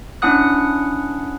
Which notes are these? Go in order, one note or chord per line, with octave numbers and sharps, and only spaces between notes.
C#4 D4 E4 F#5 D#6 F#6